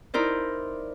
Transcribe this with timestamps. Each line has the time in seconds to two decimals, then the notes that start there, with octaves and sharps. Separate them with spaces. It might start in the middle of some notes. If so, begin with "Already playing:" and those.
0.14 D#4 E4 A#4 C5 D5